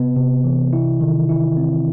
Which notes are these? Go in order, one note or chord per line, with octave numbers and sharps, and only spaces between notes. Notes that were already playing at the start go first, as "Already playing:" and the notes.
Already playing: C3 B3
C3
E3
E4
D#3
E4
C4